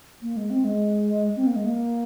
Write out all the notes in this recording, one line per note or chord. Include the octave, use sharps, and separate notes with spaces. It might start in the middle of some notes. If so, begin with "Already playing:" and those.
A#3
G#3
C4
G#3
C4
A#3
G#3
A#3